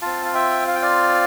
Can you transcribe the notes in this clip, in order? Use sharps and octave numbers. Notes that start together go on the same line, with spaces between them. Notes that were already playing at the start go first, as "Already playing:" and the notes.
C4 F4 F5 A5
F5
E5 G5
F5
G5
D5 F5